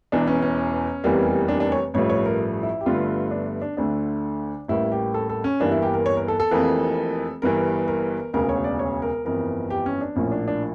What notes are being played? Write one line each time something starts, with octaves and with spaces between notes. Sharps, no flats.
E1 E2 E3 D4
C#4
C#4
F1 E2 E3 G3 A#3
D4
D4
C#5
A1 G2 F3 A3 C#5
C#5
A#4
E4
G4
G1 G2 D3 A3 F4
D4
D4
D2 D3 A3 D4
A1 A2 G3 A#3 E4
G4
A4
A4
C#4
G1 G2 E3 A#3 D4
E4
G4
A#4
C#5
A#4
A4
A4
F1 F2 E3 A#3
G1 G2 E3 A#4
A#4
E1 D2 C#3 A#4
C#5
D5
C#5
A#4
G1 F2 E3 A#4
G4
C#4
D4
A#1 A2 F3 A#3 C#4
D4
D4